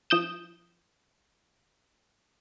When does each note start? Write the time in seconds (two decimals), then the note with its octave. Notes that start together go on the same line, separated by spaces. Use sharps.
0.10 F3 D#6 G6 E7